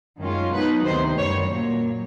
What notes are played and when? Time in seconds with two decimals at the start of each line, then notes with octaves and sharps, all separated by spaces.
0.21 F#2 D#3 G#3 C#4 F4
0.53 B2 F#3 B3 D#4 B4
0.86 D2 C3 D#3 C5
1.19 F#2 D#3 G3 C#5
1.51 A#2 F#3 A#3